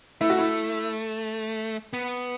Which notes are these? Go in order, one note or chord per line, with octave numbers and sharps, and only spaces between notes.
A3 E4
F#4
E4
B3